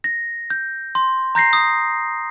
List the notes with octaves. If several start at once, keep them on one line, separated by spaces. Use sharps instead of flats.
A#6
G6
C6
A#5 G6 A#6 C7
D#6